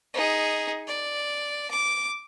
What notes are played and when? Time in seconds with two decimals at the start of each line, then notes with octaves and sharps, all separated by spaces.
0.14 D#4 G#4
0.87 D5
1.71 D6